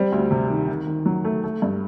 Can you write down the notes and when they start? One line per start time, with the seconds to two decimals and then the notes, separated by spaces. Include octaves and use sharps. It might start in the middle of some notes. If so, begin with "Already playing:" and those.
Already playing: G3 C4
0.12 D2
0.31 C3
0.50 D#3
0.68 D#3
0.87 D#3
1.06 F#3
1.24 A3
1.44 A3
1.62 G2